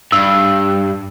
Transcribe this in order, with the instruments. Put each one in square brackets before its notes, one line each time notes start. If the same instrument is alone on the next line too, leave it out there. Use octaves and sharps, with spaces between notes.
[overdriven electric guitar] G2 [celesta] E6